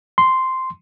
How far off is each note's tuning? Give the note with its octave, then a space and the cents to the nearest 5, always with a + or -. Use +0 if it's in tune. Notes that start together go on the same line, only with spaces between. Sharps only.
C6 -5